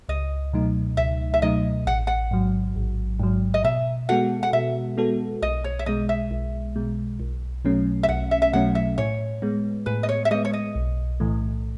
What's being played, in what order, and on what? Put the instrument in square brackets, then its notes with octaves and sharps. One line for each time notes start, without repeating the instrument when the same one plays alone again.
[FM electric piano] C#2 [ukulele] D#5
[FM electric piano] B2 F#3 A3 D#4
[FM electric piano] C#2 [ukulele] E5
[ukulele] E5
[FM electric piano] B2 F#3 A3 D#4 [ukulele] D#5
[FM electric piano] A1 [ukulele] F#5
[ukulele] F#5
[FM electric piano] G#2 F#3
A1
G#2 F#3
[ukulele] D#5
[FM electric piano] B2 [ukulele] E5
[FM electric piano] G#3 B3 F#4 A4 [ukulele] F#5
[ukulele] F#5
[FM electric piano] B2 [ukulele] E5
[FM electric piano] G#3 B3 F#4 A4
[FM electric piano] B1 [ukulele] D#5
[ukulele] C#5
E5
[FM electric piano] B2 G#3 [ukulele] D#5
[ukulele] E5
[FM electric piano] B1
B2 G#3
B1
B2 F#3 A3 C#4
[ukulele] E5
[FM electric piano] B1 [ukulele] F#5
[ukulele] E5
E5
[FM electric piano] B2 F#3 A3 C#4 [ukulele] F#5
[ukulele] E5
[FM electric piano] A2 [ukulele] C#5
[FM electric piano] G#3 B3
[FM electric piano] A2 [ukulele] B4
[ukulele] D#5
C#5
E5
[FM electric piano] G#3 B3 [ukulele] D#5
[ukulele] C#5
D#5
[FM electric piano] B1
A2 E3 A3